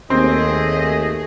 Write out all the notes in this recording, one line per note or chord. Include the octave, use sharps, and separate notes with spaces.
D#2 A3 C4 G#4 D#5